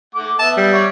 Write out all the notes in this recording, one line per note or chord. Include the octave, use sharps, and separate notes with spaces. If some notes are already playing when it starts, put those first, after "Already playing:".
A3 F#5 D6
B3 E5 A5
G3
C#5 D5 E5